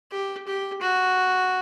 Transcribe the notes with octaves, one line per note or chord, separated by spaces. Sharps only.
G4
G4
F#4